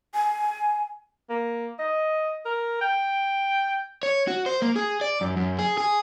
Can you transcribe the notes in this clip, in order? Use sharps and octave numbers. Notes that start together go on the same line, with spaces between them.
G#5
A#3
D#5
A#4
G5
C#5
F#4
C5
A#3
G#4
D5
F#2
F#2
G#4
G#4